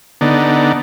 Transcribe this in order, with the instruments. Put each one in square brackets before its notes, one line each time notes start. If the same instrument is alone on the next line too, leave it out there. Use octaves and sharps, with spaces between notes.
[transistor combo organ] D3 B3 D#4 D5